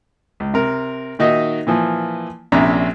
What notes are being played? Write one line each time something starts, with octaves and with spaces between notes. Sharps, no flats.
C#2
C3 A#4
A#2 D#3 D#4 F#4 D#5 E5
A#2 E3 F3
A#1 C3 C#4 D4 E5 A#5